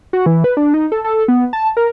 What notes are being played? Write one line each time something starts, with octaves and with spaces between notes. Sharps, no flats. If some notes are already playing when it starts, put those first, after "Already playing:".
F#4
E3
B4
D4
D#4
A4
A4
B3
A5
A#4